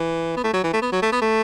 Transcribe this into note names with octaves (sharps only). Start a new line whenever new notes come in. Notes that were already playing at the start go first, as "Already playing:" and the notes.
Already playing: E3
B3
A3
F#3
E3
A3
B3
F#3
A3
B3
A3